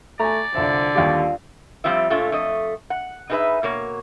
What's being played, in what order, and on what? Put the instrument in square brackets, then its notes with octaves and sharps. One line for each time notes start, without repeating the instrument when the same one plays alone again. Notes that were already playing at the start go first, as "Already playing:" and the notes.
[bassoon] A3 [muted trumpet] D5 [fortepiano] G#5 A#5
[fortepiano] C2 E5 [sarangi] D3 [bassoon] F3
[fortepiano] D#2 G3 G4 [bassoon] F4
[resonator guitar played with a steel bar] F3 G3 C4 F4 E5
A#2 A3 D4 F4 C#5
F2 A3 D#5
F#5
D#4 E4 G#4 A#4 B4 E5
B2 A#3 C#5